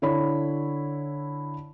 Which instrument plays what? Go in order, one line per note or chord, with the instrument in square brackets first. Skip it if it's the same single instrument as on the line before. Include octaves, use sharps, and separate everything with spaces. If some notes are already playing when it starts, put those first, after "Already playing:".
[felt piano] D3 E4 C#5 B5